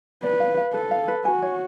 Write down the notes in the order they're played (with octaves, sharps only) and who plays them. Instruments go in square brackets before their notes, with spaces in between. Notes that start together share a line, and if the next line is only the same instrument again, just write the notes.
[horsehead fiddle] B4 [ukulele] D5
[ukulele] F5
F5
[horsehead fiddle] A4 [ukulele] B4
[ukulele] F5
B4
[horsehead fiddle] F#4 [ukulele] G#5
[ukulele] C#5